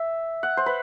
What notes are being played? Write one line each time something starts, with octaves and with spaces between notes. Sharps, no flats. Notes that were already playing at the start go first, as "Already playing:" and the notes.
Already playing: E5
F#5
C5
B4